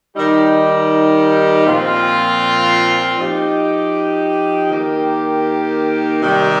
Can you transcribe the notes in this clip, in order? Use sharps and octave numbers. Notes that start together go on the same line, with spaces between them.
D#3 G3 D#4 G4
A#2 F3 C4 F4
F3 D#4 G4
D#3 A#3 G4
C3 D#3 G3 D#4 G4